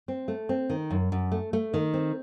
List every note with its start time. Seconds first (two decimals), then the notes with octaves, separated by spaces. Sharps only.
0.08 C4
0.28 A3
0.49 C4
0.70 D#3
0.91 F#2
1.12 F#2
1.32 A3
1.53 A3
1.74 D#3
1.94 C4